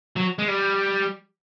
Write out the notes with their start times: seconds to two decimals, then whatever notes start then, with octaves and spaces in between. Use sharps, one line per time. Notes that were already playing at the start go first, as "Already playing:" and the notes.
0.16 F#3
0.39 G#3
0.48 G3